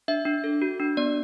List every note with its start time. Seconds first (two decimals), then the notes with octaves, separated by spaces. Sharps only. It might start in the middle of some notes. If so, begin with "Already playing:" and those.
0.08 D4 E5
0.25 D4
0.44 A4
0.62 F#4
0.80 D4
0.97 B3 D5